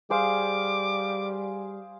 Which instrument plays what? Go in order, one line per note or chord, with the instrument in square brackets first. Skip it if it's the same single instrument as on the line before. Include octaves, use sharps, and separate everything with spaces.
[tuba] G3 [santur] G#4 C5 F5 [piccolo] D6